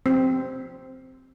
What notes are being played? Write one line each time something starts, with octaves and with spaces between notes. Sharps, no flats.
C4